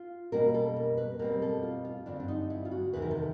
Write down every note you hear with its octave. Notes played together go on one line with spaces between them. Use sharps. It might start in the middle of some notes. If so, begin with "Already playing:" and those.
Already playing: F4
B2 G3 A#3 C#4 A#4
A4
A#4
B4
B2 G3 C4 A#4
A4
F4
F4
G2 D3 G3 C4 D4
D4
D#4
E4
F4
F#4
E2 C3 D#3 B4
A#4
A4